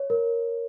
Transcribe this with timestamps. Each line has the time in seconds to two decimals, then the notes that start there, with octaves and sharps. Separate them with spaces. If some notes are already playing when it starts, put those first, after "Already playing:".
Already playing: C#5
0.10 A#4